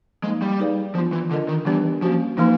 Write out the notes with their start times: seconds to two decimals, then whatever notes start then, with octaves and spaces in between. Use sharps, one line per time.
0.23 F3 G#3 A#3 D#4
0.42 G3
0.60 D#4 G#4 B4 D5 F5
0.95 F3 B3 D4 F4
1.12 E3
1.31 D3 D4 F4 A#4 D#5
1.48 D#3
1.66 E3 G3 B3 D4 G4 B4
2.02 F3 A#3 C#4 F#4
2.38 E3 F3 A#3 D#4